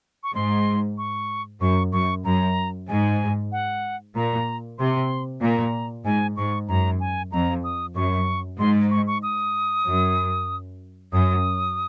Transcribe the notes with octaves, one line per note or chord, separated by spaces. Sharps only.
C#6
G#2 C6
C#6
F#2 C#6
F#2 C#6
F#2 A#5
G#2 G#5
F#5
A#2 A#5
C3 C6
A#2 A#5
G#2 G#5
G#2 C#6
F#2 A#5
G#5
F2 A#5
D#6
F#2 C#6
G#2 C6
C#6
C#6
D#6
F#2
F#2 D#6